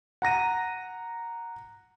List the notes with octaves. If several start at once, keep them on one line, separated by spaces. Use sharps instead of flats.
F#5 A#5 A#6 D#7